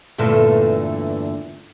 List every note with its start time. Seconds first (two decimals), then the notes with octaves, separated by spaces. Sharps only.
0.18 E2 G2 A#2 D3 A3 A4